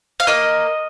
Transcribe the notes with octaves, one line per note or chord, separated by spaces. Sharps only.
F5
A#3 D#5